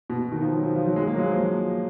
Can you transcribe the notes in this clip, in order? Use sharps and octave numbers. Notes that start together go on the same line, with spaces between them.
B2
D#3
F3
F#3
F3
F3
F#3
G#3
A#3
F#3
G#3
F3